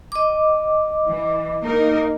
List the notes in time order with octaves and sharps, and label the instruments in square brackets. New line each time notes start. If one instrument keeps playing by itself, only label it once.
[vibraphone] D#5 D6
[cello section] E3
A#3 D#4 A#4